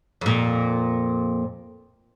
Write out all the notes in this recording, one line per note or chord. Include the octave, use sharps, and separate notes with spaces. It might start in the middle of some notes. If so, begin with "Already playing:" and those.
F2 A#2